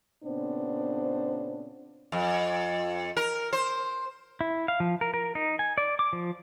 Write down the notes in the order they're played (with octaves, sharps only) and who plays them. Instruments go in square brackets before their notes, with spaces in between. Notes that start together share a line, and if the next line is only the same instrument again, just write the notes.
[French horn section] A#2 C#3 B3 C4 D4 C5
[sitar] F2
A#4
C5
[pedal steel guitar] E4
F5
F3
A#4
A#4
D#4
G#5
D5
D6
F3